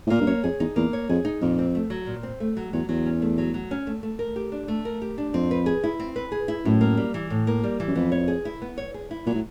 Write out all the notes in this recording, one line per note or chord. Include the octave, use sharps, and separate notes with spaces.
A2
A#2 A#3
G2
F#2 C#5
F2 G#4
E2 D#4
E2 A#3
C#5
F2 G#4
D#4
F2 A#2
C4
A3
F#3
A#2
C4
A3
F#3
E2 F#3
E2 F#3
C#4
A3
F#3
F#3
C#4
A3
A3
A#4
G4
D4
A3
A#4
G4
D4
F2 C4
B4
G#4
E4
C4
B4
G#4
E4
F#2 A2
A#3
G3
E3
A2
A#3
G3
E3
F#2
F2 B3
C#5
G#4
E4
B3
C#5
G#4
E4
A#2 F#3
A2